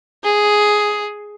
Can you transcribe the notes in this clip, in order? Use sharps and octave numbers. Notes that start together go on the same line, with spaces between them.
G#4